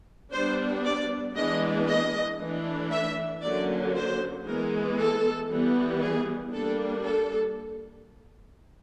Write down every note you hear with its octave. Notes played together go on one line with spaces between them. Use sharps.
G3 B3 D4 C5
D5
E3 G#3 B3 D4 D#5
D#5
E3 A3 D4
E5
D3 F#3 A#3 C#4 D5
C5
E3 G#3 B3 A#4
A4
E3 G3 B3
G#4
G3 A#3 D4 A4
A4